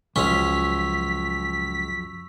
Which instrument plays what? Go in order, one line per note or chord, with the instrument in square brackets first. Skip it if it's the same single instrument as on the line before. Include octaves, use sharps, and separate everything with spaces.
[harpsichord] C#2 C#4 [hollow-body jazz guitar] F#2 F3 [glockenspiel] C#6 E6 F7 [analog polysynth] B6